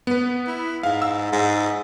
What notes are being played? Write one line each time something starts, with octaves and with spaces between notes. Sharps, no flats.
B3 B4
E4
G#2 F5
E6
G#2